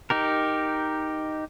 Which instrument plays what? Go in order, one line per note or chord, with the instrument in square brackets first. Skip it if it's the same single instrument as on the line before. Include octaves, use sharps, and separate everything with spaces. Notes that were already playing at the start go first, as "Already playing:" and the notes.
[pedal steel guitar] D#4 G4 A#4